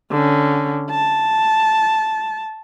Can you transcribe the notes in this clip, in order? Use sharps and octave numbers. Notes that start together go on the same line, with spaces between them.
D3 C#4
A5